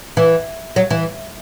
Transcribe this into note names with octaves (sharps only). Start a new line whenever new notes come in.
E3
F#3
E3